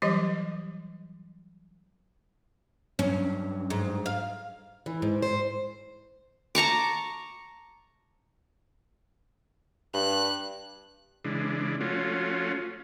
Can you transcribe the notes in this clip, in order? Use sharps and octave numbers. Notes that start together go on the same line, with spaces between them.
E3 F#3 G3 G4 D#5
G2 F#3 C#4
G#2
F5
E3
G#2
C5
A5 A#5 C#6 D6
G2 F#6
C#3 E3 G#3 D4
F3 A3 C#4 F4 F#4